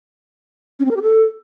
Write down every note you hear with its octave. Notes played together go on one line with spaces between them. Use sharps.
C#4
C4
A#4
G4
A4